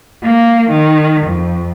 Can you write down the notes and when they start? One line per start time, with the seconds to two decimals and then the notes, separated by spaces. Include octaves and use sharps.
0.23 A#3
0.71 D#3
1.28 F2